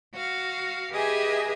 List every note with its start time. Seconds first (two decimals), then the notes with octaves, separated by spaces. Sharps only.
0.14 F#4 F5
0.90 G4 G#4 B4 D#5 E5 G#5